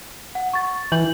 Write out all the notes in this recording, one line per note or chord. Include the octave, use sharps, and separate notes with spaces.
F#5
C#6 A6
E3 G6 F#7